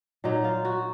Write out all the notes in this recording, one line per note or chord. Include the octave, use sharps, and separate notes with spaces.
A#2 F#3 D#4
F4
F#4